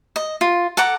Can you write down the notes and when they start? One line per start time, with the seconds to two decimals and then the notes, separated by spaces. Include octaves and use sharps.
0.16 D#5
0.41 F4
0.77 A4 F#5 A#5 D6